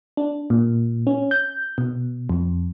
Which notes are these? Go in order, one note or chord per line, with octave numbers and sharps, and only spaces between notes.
D4
A#2
C#4
G6
B2
F2